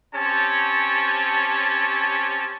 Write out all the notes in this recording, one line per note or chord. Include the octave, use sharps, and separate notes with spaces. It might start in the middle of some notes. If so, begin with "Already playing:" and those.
C4 C#4 G4 C#5 A5